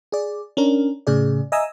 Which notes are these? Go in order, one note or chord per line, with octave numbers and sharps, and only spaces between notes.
G#4 D5
C#4 D4 A#4
A2 C#3 G#4 D5
D#5 E5 G#5 A#5 D#6 E6